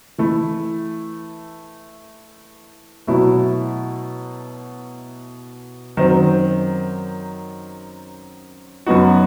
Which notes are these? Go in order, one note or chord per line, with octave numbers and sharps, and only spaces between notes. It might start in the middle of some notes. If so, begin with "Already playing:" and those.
E3 A3 E4
B2 F#3 A3 E4
F#2 D#3 F#3 C4
F#2 F#3 B3 D#4 F#4